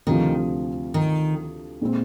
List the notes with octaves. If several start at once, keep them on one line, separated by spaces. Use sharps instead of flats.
D2 C3 D#3 F3
D#3
A#2 G#3 C4